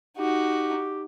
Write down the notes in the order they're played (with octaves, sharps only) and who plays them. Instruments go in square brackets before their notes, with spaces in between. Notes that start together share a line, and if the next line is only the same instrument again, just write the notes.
[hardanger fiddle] D#4 F#4 [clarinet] G4